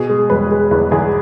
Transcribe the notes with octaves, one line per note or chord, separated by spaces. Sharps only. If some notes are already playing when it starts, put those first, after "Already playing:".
Already playing: B2 G#4
G#3
E1 B4
G#3
E2 B4
E2 G#4